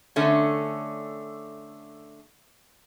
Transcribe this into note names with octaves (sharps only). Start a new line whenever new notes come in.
D3 A3 C#4